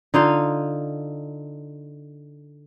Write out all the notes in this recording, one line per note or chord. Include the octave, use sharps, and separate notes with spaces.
D3 D#4 F4 F5